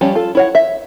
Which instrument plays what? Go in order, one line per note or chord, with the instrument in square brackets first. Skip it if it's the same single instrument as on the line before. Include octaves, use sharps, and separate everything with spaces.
[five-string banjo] F3 G3 C#4 G4
F4 A4
E4 C#5 F#5
E5